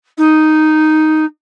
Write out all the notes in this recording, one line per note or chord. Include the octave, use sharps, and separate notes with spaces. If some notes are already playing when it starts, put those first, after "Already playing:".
D#4